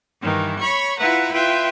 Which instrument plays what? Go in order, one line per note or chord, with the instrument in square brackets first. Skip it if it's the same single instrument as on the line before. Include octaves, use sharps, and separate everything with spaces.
[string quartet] G2 D#3 E3
C#5 B5 C#6
E4 F4 B4 E5 F#5 A#5
F4 B4 E5 G5 C6